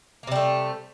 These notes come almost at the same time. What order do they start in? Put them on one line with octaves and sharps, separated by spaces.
A#3 C3 G3 A3